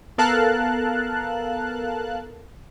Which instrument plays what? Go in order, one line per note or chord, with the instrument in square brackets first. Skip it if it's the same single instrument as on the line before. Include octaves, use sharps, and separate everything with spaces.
[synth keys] B3 A4 A#4 F5 A5 F#6